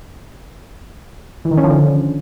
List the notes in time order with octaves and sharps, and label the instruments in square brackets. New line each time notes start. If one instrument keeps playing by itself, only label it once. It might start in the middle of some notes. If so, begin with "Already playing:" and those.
[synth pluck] E3
D#3
C#4
F3
D3